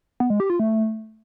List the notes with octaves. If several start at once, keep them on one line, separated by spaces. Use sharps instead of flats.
B3
G#3
G4
F4
A3